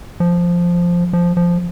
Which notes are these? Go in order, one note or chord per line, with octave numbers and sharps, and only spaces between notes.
F3
F3
F3